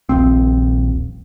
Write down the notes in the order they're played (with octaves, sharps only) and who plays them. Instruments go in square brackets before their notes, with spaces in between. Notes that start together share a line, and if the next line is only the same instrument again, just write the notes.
[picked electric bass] D#1 A#1 C4